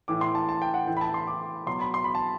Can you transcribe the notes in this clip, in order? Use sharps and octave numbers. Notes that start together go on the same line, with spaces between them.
A2 E3 D6
C6
A5
A5
G5
F#5
A2 E3 G5
B5
A5
C6
D6
B2 F#3 C6
B5
C6
B5
A5